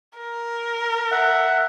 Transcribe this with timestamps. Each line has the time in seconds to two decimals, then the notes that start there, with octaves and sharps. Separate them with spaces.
0.19 A#4
1.11 E5 F#5